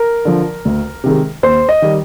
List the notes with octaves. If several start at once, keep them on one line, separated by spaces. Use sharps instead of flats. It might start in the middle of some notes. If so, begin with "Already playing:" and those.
Already playing: A#4
D3 F3
D2
C3 D#3 G#3
D#2 C5
D#5
D#3 G3